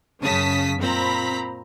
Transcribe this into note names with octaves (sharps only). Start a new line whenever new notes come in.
F#2 C#3 C#4 A5 D#6 B6
A#2 C4 A#5 B5 B6